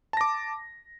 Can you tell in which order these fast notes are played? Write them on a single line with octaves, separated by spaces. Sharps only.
A5 A#6 D6